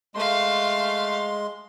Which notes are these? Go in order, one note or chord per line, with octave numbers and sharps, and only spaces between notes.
G#3 A3 F5 C6